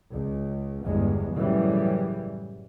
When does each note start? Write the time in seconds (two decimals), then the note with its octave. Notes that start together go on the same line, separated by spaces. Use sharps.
0.11 C#2
0.85 G1 E2 G2 G#3
1.35 F#2 A2 C#3 E3 G3